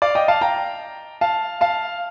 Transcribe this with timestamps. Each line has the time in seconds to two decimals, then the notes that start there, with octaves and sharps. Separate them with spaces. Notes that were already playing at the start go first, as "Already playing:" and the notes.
0.02 D5 F5
0.15 D#5 G5
0.28 F5 A5
0.41 G5 A#5
1.21 F5 A5
1.61 F5 A5